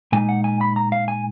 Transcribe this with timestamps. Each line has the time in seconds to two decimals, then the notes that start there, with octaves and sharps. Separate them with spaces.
0.12 A#2 G#3 D#4 G#5
0.29 F#5
0.44 G#5
0.61 B5
0.76 A#5
0.92 F5
1.08 G#5